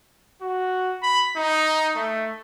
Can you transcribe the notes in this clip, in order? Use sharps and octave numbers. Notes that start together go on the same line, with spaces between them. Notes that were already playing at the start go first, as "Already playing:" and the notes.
F#4
B5
D#4
A3